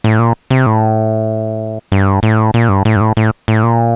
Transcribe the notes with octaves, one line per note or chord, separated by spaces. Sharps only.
A2
A#2
C3
A2
G2
A2
A#2
G2
A2
G2
A2
A2
A2
A#2